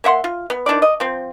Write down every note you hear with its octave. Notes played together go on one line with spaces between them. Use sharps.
A#3 E5 F#5 C6
F4
B3
D#3 D4 E4 D5
D#5
F3 C4